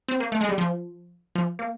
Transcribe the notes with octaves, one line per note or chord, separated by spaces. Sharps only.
C4
A#3
A3
G#3
G3
F3
F3
A#3